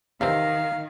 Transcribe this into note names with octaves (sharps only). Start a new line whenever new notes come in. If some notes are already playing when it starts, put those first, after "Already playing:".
E2 C3 D#3 C4 F5